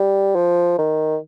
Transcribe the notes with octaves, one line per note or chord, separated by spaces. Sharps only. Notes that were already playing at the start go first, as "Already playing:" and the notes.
Already playing: G3
F3
D#3